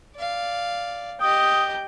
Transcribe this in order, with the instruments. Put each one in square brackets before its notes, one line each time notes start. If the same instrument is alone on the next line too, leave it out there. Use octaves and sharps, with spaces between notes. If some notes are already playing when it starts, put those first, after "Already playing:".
[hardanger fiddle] D5 F5
[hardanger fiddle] G4 D#5 [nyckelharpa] G5 [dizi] D#6